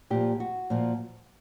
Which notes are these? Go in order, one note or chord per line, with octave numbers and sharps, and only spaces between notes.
A#2 F3 G4
F#4
A#2 F3